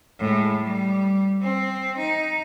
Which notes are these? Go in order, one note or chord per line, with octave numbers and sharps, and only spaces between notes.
A2 G#3
G3
C4
D#4